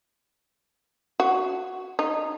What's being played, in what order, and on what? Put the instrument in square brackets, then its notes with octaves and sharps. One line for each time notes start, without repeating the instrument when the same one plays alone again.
[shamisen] F#4
D#4